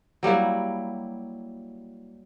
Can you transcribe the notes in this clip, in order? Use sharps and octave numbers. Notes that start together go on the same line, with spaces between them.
F#3 G3 A#3 E4